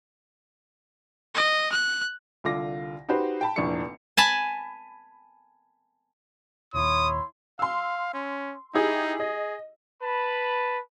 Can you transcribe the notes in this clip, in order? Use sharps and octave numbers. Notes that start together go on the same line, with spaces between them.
D#5
F#6
C2 D3 F4 D6 A#6
D#4 F#4 G4 B4 C5
G5 A5 B5
F1 A#1 E3 D4 C#6 C#7
G#5 A5 B5
D#1 D#2 E4 C#5 C6 D#6
F5 C6 E6
C#4
D#4 E4 G4 G#4
G#4 D#5
B4 A5 B5